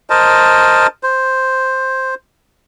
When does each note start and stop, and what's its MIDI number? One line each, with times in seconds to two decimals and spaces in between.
0.10 0.87 70
0.10 0.87 72
0.10 0.87 75
0.10 0.87 81
1.03 2.14 72